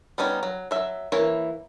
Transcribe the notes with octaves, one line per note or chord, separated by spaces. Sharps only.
G3 B3 C#4 D#4
F#3
F#3 E5
E3 A#3 E4 C#5